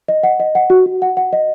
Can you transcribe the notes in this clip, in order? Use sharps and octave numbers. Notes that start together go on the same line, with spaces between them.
D#5
F#5
D#5
F#5
F#4
F#4
F#5
F#5
D#5